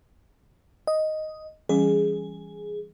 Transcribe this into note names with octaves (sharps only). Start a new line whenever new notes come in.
D#5
E3 G3 C#4 G#4